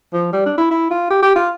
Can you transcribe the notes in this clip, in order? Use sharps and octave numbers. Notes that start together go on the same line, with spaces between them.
F3
G3
D4
E4
E4
F4
G4
G4
F4